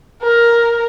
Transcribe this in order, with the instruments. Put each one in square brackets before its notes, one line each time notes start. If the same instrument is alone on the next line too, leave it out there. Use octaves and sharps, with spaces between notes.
[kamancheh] A#4